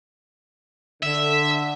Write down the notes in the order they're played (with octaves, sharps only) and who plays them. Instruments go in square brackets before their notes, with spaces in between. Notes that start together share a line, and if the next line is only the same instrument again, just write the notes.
[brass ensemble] D3 [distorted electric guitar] E5